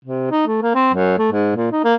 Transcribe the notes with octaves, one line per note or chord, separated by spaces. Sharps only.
C3
D#4
A3
A#3
C4
F#2
A3
G#2
A#2
D#4
A#3